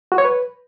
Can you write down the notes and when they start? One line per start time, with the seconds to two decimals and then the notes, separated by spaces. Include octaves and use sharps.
0.12 F#4
0.18 C#5
0.25 B4